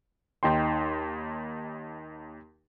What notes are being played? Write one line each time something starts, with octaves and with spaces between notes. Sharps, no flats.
D#2 D#4 G5 C6